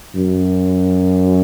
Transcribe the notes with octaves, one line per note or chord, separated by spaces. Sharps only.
F#2